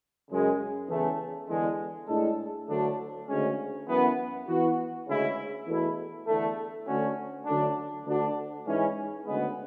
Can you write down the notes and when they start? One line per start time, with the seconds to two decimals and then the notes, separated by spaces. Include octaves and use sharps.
0.29 F#2 C#3 G#3
0.89 E2 C#3 E3 A3
1.48 E2 D3 G#3
2.08 A2 G#3 D4 A4
2.68 D2 D3 F#3 A3 D4
3.28 D2 C#3 G#3 C#4
3.88 F#2 E3 B3
4.48 E3 B3 F#4
5.07 D2 C#3 G#3 C#4 E4
5.67 E2 B2 A3 E4
6.26 E2 D3 A3
6.86 D2 D3 A3 C#4 F#4
7.45 D3 F#3 A3 D4
8.06 D2 D3 A3 D4 F#4
8.66 G#2 E3 G#3 C#4
9.26 D2 C#3 G#3 B3